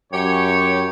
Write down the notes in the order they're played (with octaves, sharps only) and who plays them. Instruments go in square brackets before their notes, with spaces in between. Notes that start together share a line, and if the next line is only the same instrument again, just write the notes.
[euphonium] F#2 [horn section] G4 C#5